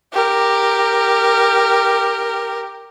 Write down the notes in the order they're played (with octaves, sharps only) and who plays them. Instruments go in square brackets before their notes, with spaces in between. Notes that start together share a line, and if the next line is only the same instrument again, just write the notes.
[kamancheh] G4 A#4